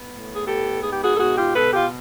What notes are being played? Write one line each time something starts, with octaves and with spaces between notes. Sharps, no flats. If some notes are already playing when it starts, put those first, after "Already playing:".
Already playing: B3
A2
G#4
B3 G4 A4
G#2 G#4
G4
F#4 G#4
A4
B2 F#4 G#4
F4 G4
B2 A4 B4
F4 G4